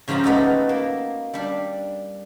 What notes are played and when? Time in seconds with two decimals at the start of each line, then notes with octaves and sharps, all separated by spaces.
0.08 C#3 F3 F4 G4 A#5
0.24 A3 B3 D#4 F#4 A4
0.69 A#3
1.34 G3 D4